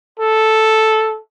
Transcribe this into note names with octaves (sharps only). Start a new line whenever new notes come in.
A4